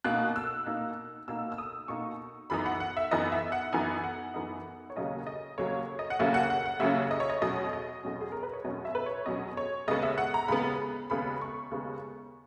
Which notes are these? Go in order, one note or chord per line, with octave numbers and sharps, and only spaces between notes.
B2 A#3 D#4 F#6
E6
B2 A#3 D#4
B2 A#3 D#4 E6
E6
D#6
B2 A#3 D#4 C#6
F#2 E3 B3 D#4 B5
F#5
F#5
E5
F#2 E3 B3 D#4 D#5
E5
F#5
F#2 E3 B3 D#4 G#5
F#5
F#2 E3 B3 D#4
C#5
D#2 C#3 F#3 A#3 C#4 D#5
D#5
D#2 C#3 F#3 A#3 C#4 C#5
D#5
F#5
D#2 C#3 F#3 A#3 C#4 E5
F#5
F#5
F#5
D#2 C#3 F#3 A#3 C#4 E5
D#5
C#5
D#5
E2 B2 F#3 C#4 D#5
D#5
E2 B2 F#3 C#4
G#4
A#4
B4
C#5
E2 B2 F#3 C#4 D#5
E5
B4
C#5
E2 B2 F#3 C#4 D#5
C#5
D#2 C#3 G#3 B3 D#5
E5
F#5
A#5
D#2 C#3 G#3 B3 B5
D#2 C#3 G#3 B3 B5
C#6
D#2 C#3 G#3 B3